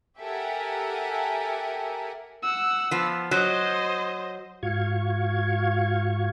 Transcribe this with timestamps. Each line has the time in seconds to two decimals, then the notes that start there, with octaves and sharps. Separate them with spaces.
0.21 G4 A4 A#4 E5 F#5 G#5
2.43 F#5 E6
2.91 F3 B3
3.31 F#3 C5 D#5
4.63 G#2 F4 F#4 F5 C#6 G#6